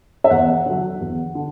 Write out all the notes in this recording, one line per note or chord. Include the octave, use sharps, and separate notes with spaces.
E5
E2 F#5
D3 F#3
E2
D3